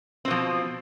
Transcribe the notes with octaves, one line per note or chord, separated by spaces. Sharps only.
B2 F3 C4